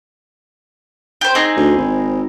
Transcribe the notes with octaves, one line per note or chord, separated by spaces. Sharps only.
G4 C5
C4 D#4 G#4
D2
G#1